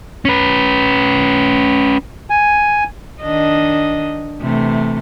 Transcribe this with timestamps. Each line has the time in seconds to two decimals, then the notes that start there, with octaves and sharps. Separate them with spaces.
0.25 C#4 B4
2.30 G#5
3.21 D#3 D4 D#5
4.41 C3 E3 A3